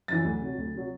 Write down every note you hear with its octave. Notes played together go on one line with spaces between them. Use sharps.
F#2 E3 A6
D2
C3 F#3
D2
C3 F#3